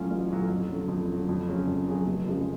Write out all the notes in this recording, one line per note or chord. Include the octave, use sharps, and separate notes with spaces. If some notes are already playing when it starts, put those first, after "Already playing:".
Already playing: A2 F#3 C#4 F4
A1
A2 F#3 C#4 F4
F2
D3 F#3
F2
D3 F#3
F2
C#3 F#3 C#4 G#4
F2
C#3 F#3 C#4 G#4
F1
F2 C#3 G#3